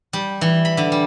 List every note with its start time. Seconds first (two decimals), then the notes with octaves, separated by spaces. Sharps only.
0.13 G3
0.41 E3
0.65 B5
0.77 D3
0.92 G3